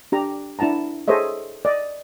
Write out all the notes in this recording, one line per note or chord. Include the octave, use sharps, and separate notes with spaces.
D4 G4 A#5
D4 E4 F#5 A5 A#5
G#4 A4 C5 C#5 D#5 E5
D5 D#5